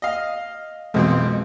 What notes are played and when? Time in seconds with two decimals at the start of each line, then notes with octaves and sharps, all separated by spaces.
0.02 D#5 F5
0.94 B1 F2 B2 E3 G#3 C4